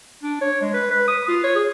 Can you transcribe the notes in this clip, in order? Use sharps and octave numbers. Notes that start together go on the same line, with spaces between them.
D4
C#5
G#3
B4
B4
D#6
F4
C#5
G#4